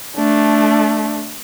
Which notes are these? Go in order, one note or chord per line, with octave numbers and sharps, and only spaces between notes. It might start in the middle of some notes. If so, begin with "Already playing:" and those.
A3 D4